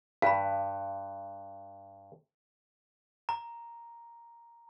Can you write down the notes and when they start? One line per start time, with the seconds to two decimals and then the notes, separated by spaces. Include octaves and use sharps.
0.22 G2 F5 B5
3.29 A#5